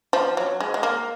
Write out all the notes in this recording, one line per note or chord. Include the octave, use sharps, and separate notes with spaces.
F3
F#3
G#3
G#3
A#3